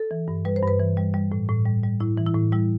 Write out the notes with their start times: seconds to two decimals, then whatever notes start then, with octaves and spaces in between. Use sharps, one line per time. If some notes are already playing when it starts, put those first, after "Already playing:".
Already playing: A4
0.11 E3
0.28 G2
0.45 G3 B4
0.56 C5
0.63 G2 B4
0.79 E3
0.97 G3
1.14 G3
1.32 A2
1.48 A2
1.66 G3
1.83 G3
2.00 A2 E4
2.17 E3
2.27 E4
2.35 A2
2.52 G3 E4